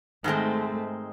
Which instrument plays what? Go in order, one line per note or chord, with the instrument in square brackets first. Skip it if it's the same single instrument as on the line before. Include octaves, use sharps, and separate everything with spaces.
[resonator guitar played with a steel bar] G#2 D#3 G#3 C4 [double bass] A3